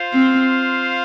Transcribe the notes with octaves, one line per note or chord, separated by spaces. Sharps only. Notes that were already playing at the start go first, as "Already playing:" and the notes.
Already playing: F4 C5 F5
C4